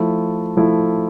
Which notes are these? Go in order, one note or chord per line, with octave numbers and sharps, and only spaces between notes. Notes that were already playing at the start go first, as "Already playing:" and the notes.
Already playing: F3 A3 E4
F3 A3 E4